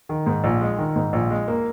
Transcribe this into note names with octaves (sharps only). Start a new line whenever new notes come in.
D#3
G#2
A#1
G#3
D#3
G#2
A#1
G#3
A#3